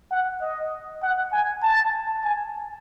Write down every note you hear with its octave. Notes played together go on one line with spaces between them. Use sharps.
F#5
D#5
F#5
G#5
A5
G#5